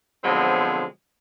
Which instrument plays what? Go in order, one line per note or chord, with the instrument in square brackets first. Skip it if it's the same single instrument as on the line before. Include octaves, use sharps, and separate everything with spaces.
[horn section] B2 D3 F3 F#3 G#3 C4